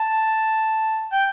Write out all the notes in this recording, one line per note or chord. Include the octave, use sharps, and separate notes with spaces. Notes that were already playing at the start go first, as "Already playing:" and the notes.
Already playing: A5
G5